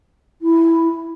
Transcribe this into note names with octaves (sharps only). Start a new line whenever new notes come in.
E4